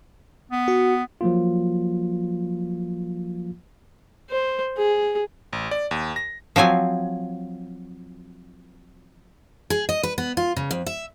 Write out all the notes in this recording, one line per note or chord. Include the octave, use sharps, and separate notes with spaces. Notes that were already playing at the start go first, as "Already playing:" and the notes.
B3
F#4
F3 F#3 A#3 F4
C5
G#4
A1
D5
D#2
A#6
F3 F#3 C4 G#5
G#4
D#5
B4
B3
F4
C#3
F2
E5